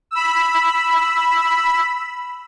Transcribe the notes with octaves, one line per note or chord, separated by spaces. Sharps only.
B5 E6